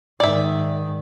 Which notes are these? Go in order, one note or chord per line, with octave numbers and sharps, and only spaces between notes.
G#2 D#3 D5 E5